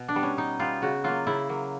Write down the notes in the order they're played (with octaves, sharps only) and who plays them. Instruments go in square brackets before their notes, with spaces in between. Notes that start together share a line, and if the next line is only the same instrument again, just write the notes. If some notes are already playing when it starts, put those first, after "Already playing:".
Already playing: [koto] B2
D4
G3 B3
C#4
B2 D#4
G3 B3 F4
C#3 F#4
F#3 A#3 F4
C#3 E4
F#3 A#3